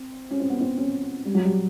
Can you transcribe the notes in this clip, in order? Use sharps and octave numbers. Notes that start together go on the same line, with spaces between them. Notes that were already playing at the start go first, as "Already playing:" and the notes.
Already playing: C4
C#4
C4
B3
C4
C#4
G3
F#3
G3